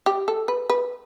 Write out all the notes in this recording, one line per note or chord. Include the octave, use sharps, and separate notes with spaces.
G4
A4
B4
B4